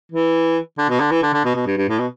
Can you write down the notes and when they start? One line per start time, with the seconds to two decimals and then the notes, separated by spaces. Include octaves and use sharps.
0.12 E3
0.78 D3
0.89 B2
1.00 D3
1.11 E3
1.22 D3
1.33 D3
1.45 B2
1.55 B2
1.66 G2
1.77 G2
1.89 A2
1.99 B2